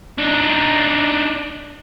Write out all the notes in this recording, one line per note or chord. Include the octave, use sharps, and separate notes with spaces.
D4 D#4